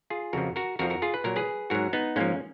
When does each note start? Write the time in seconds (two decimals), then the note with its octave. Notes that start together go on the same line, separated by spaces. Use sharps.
0.10 F4 G#4
0.33 F2 C#3 F3 F#4 A#4
0.56 F#4 A#4
0.79 F2 F3 F#4 A#4
0.90 F#4 A#4
1.02 F4 G#4
1.14 B4
1.24 A#2 F#3 A#4
1.36 G#4 B4
1.70 G#2 F#3 F#4 A#4
1.93 B3 D#4
2.16 G#2 F3 A#3 C#4